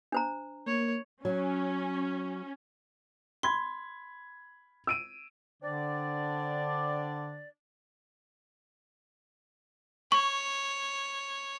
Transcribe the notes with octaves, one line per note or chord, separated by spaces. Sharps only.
D4 C5 A#5
A#3 C#5
F#3 C#4
B5 C6 G#6
E6 D7 D#7
D3 C4 D4 D5
C#5 C#6